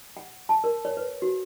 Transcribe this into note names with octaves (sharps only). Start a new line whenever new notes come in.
F#5
A5
A#4
C#5
B4
F#4